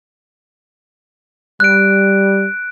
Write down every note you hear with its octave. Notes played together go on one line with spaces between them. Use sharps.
G3 F#6 D7